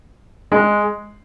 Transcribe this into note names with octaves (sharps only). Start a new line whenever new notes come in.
G#3